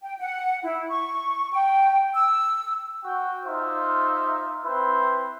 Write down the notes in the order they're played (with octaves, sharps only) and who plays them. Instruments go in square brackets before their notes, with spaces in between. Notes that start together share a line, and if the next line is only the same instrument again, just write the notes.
[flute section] G5
F#5
E4
C#6
G5
E6
[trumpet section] F#4 G5
D#4 F4 C5 E5
C4 E4 B4 C5